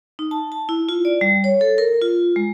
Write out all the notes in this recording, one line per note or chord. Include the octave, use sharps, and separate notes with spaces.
D#4
A5
A5
E4
F4
D5
G3
C#5
A4
A#4
F4
G#3